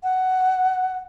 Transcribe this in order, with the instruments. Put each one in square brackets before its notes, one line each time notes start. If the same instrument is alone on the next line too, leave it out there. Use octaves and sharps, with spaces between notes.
[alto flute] F#5